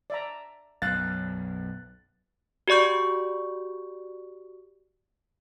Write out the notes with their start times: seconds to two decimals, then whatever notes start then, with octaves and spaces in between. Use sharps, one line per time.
0.10 D5 E5 A#5
0.82 B1 F#2 F5 F#6 A6
2.68 F#4 G4 D5 C#6 G6